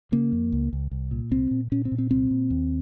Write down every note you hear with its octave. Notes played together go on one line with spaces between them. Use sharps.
C#3 A#3
F2
C#2
C#2
C2
A#2
C2 C4
A#2
A#2 C#4
C4
A#2
C4
C2 C4
A#2
D#2